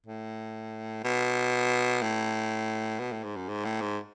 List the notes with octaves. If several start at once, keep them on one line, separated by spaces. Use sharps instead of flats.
A2
B2
A2
B2
A2
G#2
F#2
G#2
A2
G#2